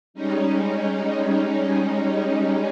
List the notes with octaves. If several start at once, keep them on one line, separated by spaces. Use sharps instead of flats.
G3 G#3 C#4 D#4